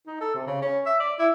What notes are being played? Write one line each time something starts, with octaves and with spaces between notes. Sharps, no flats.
D#4
A4
C3
C#3
C#4
E5
D5
E4